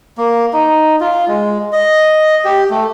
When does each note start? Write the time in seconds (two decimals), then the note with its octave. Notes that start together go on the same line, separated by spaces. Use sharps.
0.18 A#3
0.53 D#4
1.01 F4
1.28 G#3
1.72 D#5
2.45 G4
2.70 A3